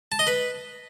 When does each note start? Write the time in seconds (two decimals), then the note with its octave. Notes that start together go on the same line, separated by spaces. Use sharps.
0.12 A5
0.19 D#5
0.27 B4